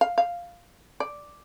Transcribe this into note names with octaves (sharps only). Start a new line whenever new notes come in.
F5
F5
D5